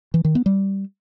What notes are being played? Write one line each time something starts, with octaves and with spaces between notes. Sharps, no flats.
E3
D#3
B3
G3